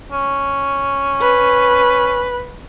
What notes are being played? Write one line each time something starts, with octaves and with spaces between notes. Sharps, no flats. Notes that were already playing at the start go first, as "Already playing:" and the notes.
C#4
B4